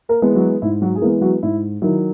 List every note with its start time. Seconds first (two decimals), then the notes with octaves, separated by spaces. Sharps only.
0.09 A#3 A#4
0.22 E3 G#3 B3
0.35 F#3 F#4
0.62 G#2 E4
0.82 F#3 F#4
0.95 G#4
1.02 E3 G#3 A#3 B3 A#4
1.22 F#3 F#4
1.43 G#2 E4
1.82 D#3 F#3 E4